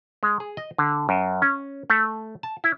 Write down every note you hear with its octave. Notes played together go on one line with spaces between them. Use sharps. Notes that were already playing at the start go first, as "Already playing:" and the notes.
G#3
G#4
D#5
D3
F#2
C#4
A3
A5
E4